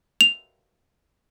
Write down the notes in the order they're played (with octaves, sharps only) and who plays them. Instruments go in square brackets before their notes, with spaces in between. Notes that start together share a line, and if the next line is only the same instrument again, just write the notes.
[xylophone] F7